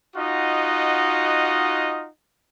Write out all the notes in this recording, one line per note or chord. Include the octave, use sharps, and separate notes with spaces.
D#4 F4 F#4 D#5 F#5